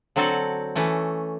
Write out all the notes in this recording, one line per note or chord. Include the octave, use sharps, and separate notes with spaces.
D3 F#3 C4 F#4 A4
E3 A3 C#4